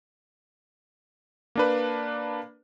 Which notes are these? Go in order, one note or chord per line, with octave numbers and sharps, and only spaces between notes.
A#3 D4 B4